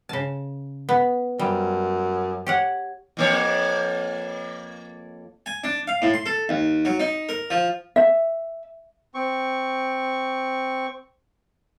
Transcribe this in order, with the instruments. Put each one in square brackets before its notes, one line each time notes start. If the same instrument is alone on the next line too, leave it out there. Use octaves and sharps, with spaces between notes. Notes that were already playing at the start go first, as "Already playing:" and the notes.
[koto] C#3 A5
B3
[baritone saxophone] F#2 [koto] G3
[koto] G4 C#5 F#5
[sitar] F2 A#3 C#5
[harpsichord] G#5
D4
F5
A2
C6
A4
D#2
F#3
D#4
A#4
F3
[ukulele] E5
[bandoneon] C4 C#6